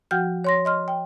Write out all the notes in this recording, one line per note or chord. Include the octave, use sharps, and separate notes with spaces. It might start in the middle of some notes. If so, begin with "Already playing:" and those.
F3 F#4 F#5 G5 F6 G6
C#5 C6 A#6
D#5 C6 F6
G5